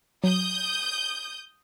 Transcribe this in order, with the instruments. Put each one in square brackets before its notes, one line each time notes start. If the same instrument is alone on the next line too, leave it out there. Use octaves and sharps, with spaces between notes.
[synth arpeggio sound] F#3 [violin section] D#6 G6